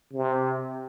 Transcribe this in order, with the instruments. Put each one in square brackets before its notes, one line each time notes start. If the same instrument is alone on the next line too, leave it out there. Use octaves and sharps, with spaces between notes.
[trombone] C3